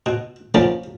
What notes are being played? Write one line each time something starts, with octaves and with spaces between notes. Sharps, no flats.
B2
F3 A#3 B3 C#4 D5